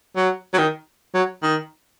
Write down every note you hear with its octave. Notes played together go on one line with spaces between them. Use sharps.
F#3
F#3
D#3
F#3
D#3